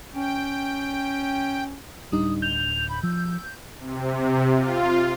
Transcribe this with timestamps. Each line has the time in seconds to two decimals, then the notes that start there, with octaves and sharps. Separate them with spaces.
0.15 C#4 G5
2.12 D1 G3 D4 D#4 D#6
2.42 G6 F7
2.89 B5
3.03 F3 E6
3.79 C3
4.56 F4